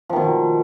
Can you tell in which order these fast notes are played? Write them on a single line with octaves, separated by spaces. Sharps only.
F3 D#3 B2